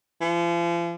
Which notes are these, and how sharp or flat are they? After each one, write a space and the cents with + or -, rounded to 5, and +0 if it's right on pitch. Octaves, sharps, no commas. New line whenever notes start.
F3 -35